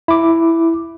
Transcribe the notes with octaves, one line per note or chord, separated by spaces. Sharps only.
E4 D6